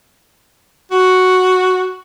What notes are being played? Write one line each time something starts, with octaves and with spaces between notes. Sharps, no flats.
F#4